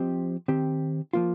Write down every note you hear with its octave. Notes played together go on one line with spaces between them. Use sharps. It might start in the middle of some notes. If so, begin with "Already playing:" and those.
Already playing: F3 C4 G4 C5 D#5
D#3 C4 G4
F3 A#3 F4